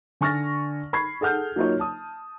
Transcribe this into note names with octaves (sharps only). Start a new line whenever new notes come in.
D3 G#5 C#6 F6 A6 A#6
B5 C#6 G#6 C7
G#4 A4 F#5 F6 G6
F#3 A#3 D#4 F4 C#5
A5 D#6